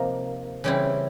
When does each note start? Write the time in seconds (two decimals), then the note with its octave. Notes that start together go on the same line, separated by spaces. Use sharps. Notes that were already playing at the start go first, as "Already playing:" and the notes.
Already playing: C3 F3 A#3 D#4
0.64 C#3 E3 G3 C4 E4